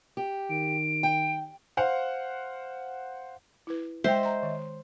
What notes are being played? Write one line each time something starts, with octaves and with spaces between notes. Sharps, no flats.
G4
D#3 D7
G5
C5 F5 F#5
E4 B4
G#3 C5 D#5 E5 G5
A#5 C6
D#3